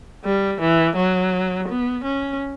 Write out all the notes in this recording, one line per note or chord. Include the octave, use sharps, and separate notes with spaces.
G3
E3
F#3
B3
C#4